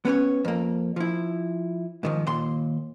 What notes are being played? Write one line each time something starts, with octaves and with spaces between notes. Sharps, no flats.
B3 C#4 B4 C#5
F2 A#3
F3 E4
G#2 D#3 F3
D#2 A#2 C6